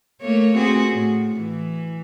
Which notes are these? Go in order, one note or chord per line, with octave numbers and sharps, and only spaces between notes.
A3 A#3 C#5
C4 F#4 G#4
A2
E3